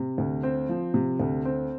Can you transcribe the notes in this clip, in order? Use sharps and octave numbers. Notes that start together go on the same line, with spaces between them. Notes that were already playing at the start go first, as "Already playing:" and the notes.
Already playing: C3
D2
C4
F3
C3
D2
C4